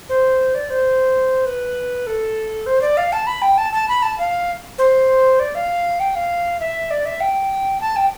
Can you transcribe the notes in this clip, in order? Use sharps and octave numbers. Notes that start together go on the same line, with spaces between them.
C5
D5
C5
B4
A4
C5
D5
F5
A5
B5
G5
A5
A5
B5
A5
F5
C5
D5
F5
G5
F5
E5
D5
E5
G5
A5
G5